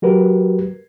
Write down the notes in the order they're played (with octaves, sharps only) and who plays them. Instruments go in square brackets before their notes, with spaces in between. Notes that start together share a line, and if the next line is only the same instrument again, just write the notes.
[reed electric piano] F#3 F#4 G4 A#4 B4